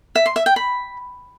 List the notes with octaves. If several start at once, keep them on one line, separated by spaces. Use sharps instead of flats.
E5
C6
E5
G5
B5